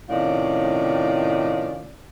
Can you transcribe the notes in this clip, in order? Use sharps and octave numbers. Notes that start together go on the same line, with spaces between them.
A2 C3 D#3 C#4 F4 D5